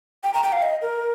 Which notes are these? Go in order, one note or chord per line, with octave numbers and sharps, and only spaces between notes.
G5
A#5
G5
F5
D#5
A#4